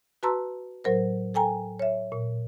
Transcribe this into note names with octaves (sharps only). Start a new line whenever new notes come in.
F#4 B4 A5 A#5 C6 E6
A2 F#3 A#4 C5
A4 G5 G#5 A#5
C#5 E5
A#2